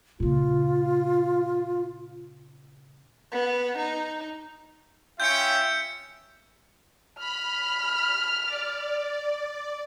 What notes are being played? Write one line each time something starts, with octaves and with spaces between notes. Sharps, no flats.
A#2 C#3 F4
B3
D#4
C#4 F4 E5 G5 G6 C#7
B5 F6
D5